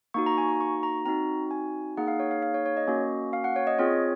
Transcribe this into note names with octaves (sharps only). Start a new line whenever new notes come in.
A#3 D#4 F#4 C#6
A#5
G#5
A#5
C#6
A#5
C4 D#4 F#4 A#5
G#5
A#3 D#4 G#4 F#5
F5
C#5
F5
F5
C#5
C#5
D#5
A#3 C#4 F#4
F5
F#5
C#5
D#5
C4 F4 G#4 C#5